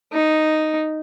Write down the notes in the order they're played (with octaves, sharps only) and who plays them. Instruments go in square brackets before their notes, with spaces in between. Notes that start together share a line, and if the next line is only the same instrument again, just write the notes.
[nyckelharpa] D#4